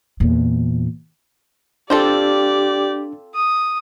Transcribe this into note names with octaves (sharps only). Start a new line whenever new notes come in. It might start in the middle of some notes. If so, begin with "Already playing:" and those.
E2 A#2
C4 D4 F4 G4 A4 D5
D#6